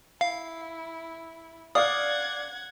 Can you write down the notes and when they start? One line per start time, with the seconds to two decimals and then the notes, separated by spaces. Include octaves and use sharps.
0.21 E4 F5
1.75 D5 F5 F#5 D#6 G#6